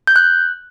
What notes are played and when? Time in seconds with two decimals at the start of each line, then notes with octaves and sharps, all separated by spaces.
0.07 G6
0.16 F#6